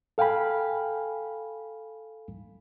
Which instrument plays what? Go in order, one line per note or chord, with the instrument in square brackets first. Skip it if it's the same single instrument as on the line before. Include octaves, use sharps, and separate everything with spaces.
[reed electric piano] A4 F5 G5 G#5 B5